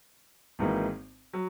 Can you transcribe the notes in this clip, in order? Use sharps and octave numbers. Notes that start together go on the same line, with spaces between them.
G#1 G#2 E3 A#3 D#4
F#3